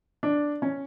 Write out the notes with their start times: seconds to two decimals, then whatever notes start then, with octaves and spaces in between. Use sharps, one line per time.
0.23 D4
0.62 C#4